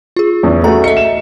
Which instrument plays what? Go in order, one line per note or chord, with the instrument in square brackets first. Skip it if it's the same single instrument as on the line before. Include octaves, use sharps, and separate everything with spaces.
[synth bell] F4 G#4
[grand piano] E2 C#4
[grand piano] A3 F#4 G#4 [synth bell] A#5
[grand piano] A4 C#7 [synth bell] D#5 E5
[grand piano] E7